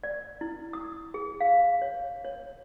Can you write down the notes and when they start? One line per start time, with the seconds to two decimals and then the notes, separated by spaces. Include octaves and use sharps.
0.03 D5
0.41 E4
0.73 D#6
1.14 G#4
1.40 F5
1.82 C#5
2.25 C#5